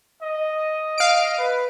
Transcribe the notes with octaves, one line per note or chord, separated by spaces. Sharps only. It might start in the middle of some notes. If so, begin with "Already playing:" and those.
D#5
F5 D7
B4